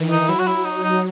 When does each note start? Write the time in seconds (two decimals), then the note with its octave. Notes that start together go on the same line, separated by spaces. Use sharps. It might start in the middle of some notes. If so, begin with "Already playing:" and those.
Already playing: D#3 E3
0.11 D#4
0.29 F#3 E4
0.39 F#4
0.47 E4
0.65 D#4
0.83 D#4